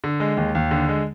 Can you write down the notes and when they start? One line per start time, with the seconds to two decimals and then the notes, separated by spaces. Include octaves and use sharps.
0.04 D3
0.20 G#3
0.37 D#2
0.55 D#2
0.71 D3
0.89 G#3